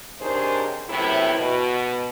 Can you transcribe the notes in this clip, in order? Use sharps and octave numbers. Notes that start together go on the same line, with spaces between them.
C3 D#3 D4 G#4 C5 C#5
F#2 A2 C3 B3 E4
B2